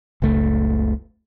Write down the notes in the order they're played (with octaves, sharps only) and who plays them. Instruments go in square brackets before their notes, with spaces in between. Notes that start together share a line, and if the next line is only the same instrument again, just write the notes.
[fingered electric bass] F#1 C#2 A3